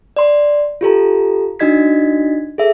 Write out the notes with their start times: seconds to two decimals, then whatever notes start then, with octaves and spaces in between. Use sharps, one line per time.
0.17 D5 C6
0.81 F4 G4 A4 A#5
1.60 D4 D#4 F#4 D#5 G#6 B6
2.58 G#4 A4 E5